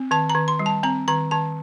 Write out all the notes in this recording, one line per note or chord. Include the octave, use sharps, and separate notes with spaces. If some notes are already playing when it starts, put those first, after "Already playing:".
Already playing: C4
D#3 A5
A#5
D#3
C6
G3
A5
C4 A#5
D#3 A#5
D#3 A5